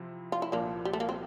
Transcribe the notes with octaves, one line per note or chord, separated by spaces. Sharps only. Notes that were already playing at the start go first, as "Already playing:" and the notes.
Already playing: C3 F3 C4 E4
F4
E4
C2 A#2 F3 A#3 D4
G3
A3
A#3
C4